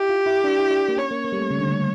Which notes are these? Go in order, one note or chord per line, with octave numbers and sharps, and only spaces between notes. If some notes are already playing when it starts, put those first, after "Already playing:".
Already playing: E4 G4
F4
E4
D4
E4
D4
A#3
C#4 C#5
A#3
A#3
G3
A3
C#3
D3
C#3